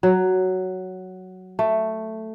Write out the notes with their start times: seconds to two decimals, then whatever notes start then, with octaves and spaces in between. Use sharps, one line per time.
0.03 F#3
1.59 A3